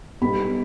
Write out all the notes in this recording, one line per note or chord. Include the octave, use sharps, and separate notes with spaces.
B1 B2 G3 B3 B5